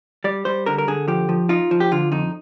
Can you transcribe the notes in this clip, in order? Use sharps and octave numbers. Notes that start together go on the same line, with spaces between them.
G3 D5
G3 C5
D3 A#4
A#4
D3 G#4
F3 G4
F3
D#4 F4
F3
G4
D3 F4
F2 D#4